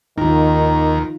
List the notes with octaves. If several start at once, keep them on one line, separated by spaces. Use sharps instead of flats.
D#2 D#3 D#4 F4 A#4